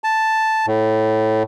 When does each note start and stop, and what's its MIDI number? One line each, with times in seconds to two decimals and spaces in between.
0.04 0.66 81
0.67 1.43 45